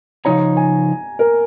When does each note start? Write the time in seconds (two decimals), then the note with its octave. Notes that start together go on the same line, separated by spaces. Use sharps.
0.25 C#3 F3 D#4 C#5 A#5
0.57 G#5
1.19 A#4